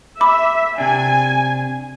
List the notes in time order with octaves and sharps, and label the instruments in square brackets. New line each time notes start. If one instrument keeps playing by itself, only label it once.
[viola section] E5 [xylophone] B5 D6
[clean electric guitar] C3 D4 [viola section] G#5